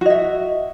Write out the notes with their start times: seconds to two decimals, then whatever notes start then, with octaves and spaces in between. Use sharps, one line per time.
0.01 F#4
0.06 D#5
0.10 E5